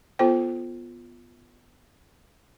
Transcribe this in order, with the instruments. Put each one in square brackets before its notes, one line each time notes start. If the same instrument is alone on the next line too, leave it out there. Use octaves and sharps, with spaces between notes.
[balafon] B3 F4 A4 C5 G5